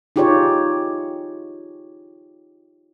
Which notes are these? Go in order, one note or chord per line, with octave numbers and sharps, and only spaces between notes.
D#4 F4 G4 G#4 C#5 D5